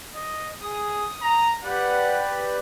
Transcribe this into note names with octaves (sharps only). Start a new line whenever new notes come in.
D#5
G#4 D#6
A#5
G4 B4 D5 F#5